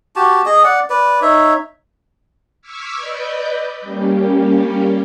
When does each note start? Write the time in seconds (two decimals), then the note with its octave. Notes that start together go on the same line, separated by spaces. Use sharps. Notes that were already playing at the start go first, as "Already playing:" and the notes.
0.16 F#4 G4 A5
0.45 G#4 D#5
0.64 D5 F#5
0.90 B4 D5
1.22 D#4 C#5 E5
2.62 C#6 D6 E6 F6 G#6 B6
2.96 B4 D5 D#5 G6
3.81 G3 A#3 C#4 G4